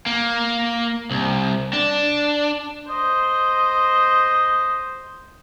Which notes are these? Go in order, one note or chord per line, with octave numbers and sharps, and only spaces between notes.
A#3
C2
D4
C5 D#5